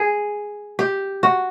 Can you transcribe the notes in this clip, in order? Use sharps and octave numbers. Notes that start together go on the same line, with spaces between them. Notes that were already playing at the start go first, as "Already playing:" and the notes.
Already playing: G#4
G4
F#4